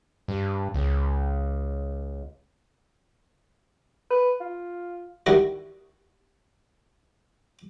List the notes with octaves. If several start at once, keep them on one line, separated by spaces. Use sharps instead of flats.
G2
C#2
B4
F4
D#3 G3 E4 F#4